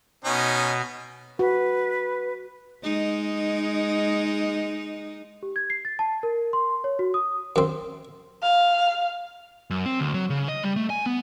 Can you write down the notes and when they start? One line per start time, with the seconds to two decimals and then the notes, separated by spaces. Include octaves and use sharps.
0.25 B2 C#4 D#4
1.39 F#4 B4
2.83 G#3 D#4
5.43 G4
5.56 G#6
5.70 C7
5.85 A6
5.99 A5
6.23 A#4
6.53 C6
6.84 C#5
6.99 F#4
7.14 D#6
7.56 F#2 C4
8.43 F5
9.70 F#2
9.86 C4
10.00 D2
10.14 F#3
10.30 C#3
10.48 D#5
10.63 G3
10.76 A3
10.90 G#5
11.06 B3